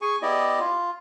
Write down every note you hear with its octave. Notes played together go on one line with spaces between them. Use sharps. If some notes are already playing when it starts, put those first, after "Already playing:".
G#4 G#5 C#6
B3 E4 G4 D5 D#5
F4